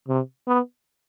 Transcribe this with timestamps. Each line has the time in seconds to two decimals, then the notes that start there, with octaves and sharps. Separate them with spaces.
0.08 C3
0.47 B3